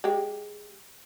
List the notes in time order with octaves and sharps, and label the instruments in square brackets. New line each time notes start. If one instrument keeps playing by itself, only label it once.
[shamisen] G#3 G4